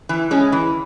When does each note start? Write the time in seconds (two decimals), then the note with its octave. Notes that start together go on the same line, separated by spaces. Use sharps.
0.09 E3
0.31 G#3 C#4
0.52 E3